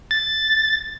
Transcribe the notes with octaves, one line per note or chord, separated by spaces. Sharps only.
A6